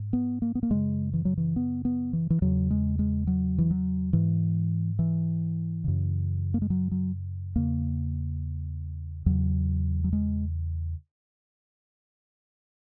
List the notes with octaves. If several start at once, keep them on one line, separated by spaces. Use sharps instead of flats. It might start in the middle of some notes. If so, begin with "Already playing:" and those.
Already playing: G#2
B3
A#3
B3
A#3
F#2 C#3 G#3
E3
F#3
E3
B3
B3
E3
E3
E2 C#3 F#3
G#3
G#3
F#3
E3
F#3
G#2 E3
E3
F#2 C#3
A#3
G#3
F#3
F#3
E2 C#3 A#3
E2 C#3 F#3
F#3
G#3